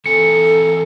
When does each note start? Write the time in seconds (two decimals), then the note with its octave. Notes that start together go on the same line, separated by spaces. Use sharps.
0.06 E3 C4 A4 G#5 C#7